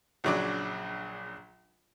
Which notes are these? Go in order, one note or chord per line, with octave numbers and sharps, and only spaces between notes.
A#1 C#3 F#3 D4 D6